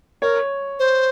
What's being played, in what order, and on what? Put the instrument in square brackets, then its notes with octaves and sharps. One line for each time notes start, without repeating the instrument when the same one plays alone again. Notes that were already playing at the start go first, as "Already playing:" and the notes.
[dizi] A#4 [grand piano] C#5
[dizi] C5